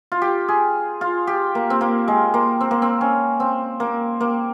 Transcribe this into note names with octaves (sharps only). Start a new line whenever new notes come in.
F4
G4
G#4
F4
G4
A#3
C4
A#3
G#3
A#3
C4
A#3
C4
C#4
C4
A#3
A#3